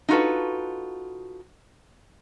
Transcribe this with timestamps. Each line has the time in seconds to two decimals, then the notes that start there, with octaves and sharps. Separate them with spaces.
0.09 D#4 F4 F#4 A4 B4